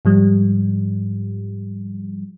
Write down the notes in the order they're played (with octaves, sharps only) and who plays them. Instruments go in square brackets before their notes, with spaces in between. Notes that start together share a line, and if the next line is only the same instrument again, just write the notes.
[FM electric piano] G#2 F3 G3